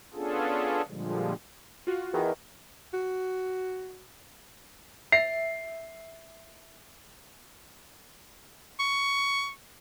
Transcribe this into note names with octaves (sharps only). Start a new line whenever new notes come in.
B3 C#4 D4 F4 G#4 A4
A#2 D3 F3 G3 G#3
F4 F#4
E2 D#3
F#4
E5 C7
C#6